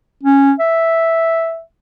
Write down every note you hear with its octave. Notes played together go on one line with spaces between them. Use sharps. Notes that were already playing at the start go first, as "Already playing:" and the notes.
C#4
E5